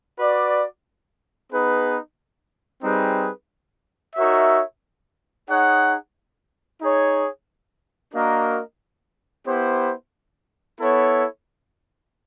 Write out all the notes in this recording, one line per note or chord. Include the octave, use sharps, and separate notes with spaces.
F#4 B4 D5
B3 D#4 G#4 B4
G3 C4 D#4 G#4 B4
D#4 F#4 A#4 C#5 E5
D#4 G#4 C#5 F#5
D#4 G#4 C#5
A#3 D4 F#4 A#4 D#5
B3 E4 G4 C5
B3 E4 A4 C#5